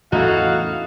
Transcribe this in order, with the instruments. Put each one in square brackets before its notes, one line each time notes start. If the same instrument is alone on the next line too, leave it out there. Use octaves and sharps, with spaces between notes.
[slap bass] E2 A2 C#4 [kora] D#4 E4 A4 [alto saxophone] F#4 [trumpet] F5